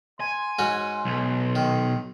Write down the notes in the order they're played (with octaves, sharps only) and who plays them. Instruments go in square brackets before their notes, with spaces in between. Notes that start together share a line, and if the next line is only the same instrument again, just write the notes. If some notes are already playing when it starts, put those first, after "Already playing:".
[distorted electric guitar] G#5 [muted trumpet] C6
[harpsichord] G#2 C#4 F#4
[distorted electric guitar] B1
[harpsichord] D#3